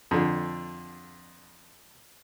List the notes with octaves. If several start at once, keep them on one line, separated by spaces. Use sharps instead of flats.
F2 D3